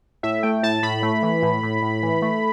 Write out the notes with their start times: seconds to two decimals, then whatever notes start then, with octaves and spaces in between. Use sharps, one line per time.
0.23 A2 E5
0.43 A3 G5
0.63 A2 A5
0.83 A2 B5
1.03 A3
1.23 E3
1.42 A2
1.63 A2
1.82 A2
2.03 E3
2.22 A3